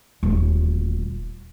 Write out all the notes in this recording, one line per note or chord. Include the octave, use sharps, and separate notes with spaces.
D#1 D2